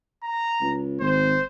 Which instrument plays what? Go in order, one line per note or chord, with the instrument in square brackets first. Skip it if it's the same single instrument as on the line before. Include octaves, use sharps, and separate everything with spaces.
[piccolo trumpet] A#5
[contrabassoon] C#2
[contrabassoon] G#1 [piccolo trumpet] C5